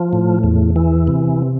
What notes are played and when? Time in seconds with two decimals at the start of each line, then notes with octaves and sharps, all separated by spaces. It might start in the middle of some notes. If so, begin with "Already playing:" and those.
Already playing: F3
0.13 A2
0.43 E2
0.76 E3
1.07 C3